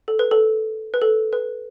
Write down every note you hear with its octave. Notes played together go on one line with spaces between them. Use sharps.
A4
B4
A4
B4
A4
B4